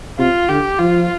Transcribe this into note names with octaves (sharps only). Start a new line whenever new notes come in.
C3 F4
D3 G4
F3 F4